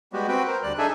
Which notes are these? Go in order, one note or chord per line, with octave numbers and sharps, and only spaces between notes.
G3 G#3 B3 F#4 G4
C4 F#4 B4 G5
A#4 C5
D2 G3 D5 F#6
D4 D#4 G#4 A4 E5 G#5